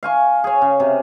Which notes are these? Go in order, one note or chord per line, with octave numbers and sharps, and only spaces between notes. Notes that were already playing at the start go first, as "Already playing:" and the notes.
F5 G#5 C#6
G#4 C#5
C#3
C3